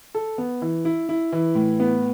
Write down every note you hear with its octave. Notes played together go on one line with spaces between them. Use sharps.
A4
B3
E3
E4
E4
E3
A2
B3